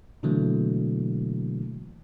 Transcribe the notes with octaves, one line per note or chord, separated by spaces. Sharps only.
B2 D3 E3 F#3 A3 A#3